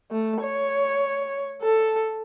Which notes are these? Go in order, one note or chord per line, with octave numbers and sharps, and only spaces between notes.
A3
C#5
A4